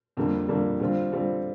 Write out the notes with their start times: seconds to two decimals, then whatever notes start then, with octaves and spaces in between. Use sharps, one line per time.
0.17 F2 D3 G3 A#3
0.48 F2 D3 G3 A#3
0.80 D3 G3 C4 F4
1.12 D3 G3 C4 F4